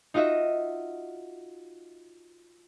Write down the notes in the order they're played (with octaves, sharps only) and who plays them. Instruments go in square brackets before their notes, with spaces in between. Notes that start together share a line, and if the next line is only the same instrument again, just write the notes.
[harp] D#4 F4 F#4 D#5 E5